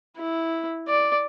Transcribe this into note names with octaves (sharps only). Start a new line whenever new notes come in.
E4
D5